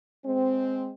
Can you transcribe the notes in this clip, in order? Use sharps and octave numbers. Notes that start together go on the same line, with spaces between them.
G#3 C4